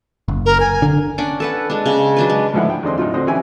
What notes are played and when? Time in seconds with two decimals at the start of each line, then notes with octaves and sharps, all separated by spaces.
0.28 F#1
0.46 A#4
0.60 G#5
0.82 D3
1.18 C#4 D4 F#5 D6
1.40 A4 B4 F#5
1.70 G#3 D4
1.86 C#3
2.16 F#3 D4 B4
2.29 G#3
2.54 G#2 D3 F3 E4 F#5
2.70 G5
2.83 E2 D3 C4 D4 D#5 C6
2.98 A2 F#3 D#4 F4 C6
3.14 D3 C4 F#4 D#5
3.27 C#3 E3 E4 G4 G#5